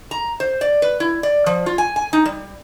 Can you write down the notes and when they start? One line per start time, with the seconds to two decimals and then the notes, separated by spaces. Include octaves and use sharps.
0.11 A#5
0.40 C5
0.61 D5
0.82 B4
1.00 E4
1.23 D5
1.46 F3
1.66 F4
1.78 G#5
1.96 G#5
2.13 D#4
2.25 G3